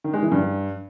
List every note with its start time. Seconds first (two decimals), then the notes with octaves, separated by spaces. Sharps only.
0.04 D#3
0.13 G#3
0.23 E3
0.32 G2